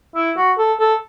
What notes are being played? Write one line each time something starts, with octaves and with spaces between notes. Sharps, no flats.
E4
F#4
A4
A4